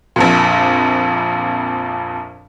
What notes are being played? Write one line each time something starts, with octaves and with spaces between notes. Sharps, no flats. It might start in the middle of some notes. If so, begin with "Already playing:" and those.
A#1 F2 A#2